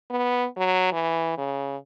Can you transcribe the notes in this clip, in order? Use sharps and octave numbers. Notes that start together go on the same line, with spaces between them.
B3
F#3
E3
C#3